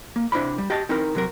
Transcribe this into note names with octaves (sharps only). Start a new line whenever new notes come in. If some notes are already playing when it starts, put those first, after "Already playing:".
A#3
C3 D4 E4 C5 D5 B5
G3
G4 D#5 G5 A5
C4 D#4 E4 A#4
C3 F#3 A#4